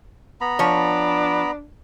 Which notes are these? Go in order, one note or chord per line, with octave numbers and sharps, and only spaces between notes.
B3 A#5 B5
F3 D4 C#5